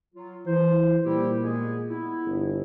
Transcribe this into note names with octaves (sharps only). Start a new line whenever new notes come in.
F#3 F4
E3 C5
A#2 G3 E4 G4
G#3 B3 G#4
B3 E4
G1